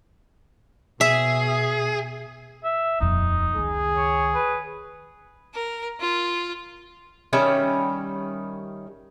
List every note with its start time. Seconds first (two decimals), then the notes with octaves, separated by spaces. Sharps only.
1.01 B2 G#4 E5
2.64 E5
3.00 D#1 F2 D#4
3.56 C#2 D#3 G#4
3.97 C#5
4.35 B4
5.54 A#4
6.00 F4
7.33 D#3 G3 C#4 E5